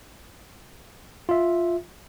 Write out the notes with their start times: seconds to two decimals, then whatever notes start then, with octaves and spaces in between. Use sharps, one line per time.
1.29 F4 E5